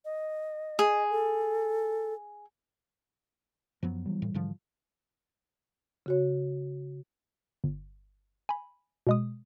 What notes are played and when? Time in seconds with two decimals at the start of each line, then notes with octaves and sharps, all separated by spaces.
0.05 D#5
0.79 G#4
1.10 A4
3.83 F#2 F3 F#3 B3
4.06 E3 G3
4.22 A2
4.34 G#2 D3 F3
6.06 C#3 F#4 C#5
7.64 G1
8.49 G#5 B5
9.07 B2 G#3 D#6